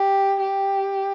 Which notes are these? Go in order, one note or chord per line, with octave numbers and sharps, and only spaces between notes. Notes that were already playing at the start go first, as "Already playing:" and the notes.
Already playing: G4
G4